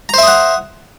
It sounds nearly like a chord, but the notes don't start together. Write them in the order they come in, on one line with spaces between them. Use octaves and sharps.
A#5 C5 E5 D#6 F#5